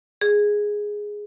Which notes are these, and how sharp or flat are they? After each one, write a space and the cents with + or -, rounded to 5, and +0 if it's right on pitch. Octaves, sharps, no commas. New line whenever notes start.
G#4 +0